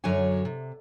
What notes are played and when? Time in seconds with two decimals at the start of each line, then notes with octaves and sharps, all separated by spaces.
0.04 F#2 D3 F#3 C#5 G#5
0.45 C3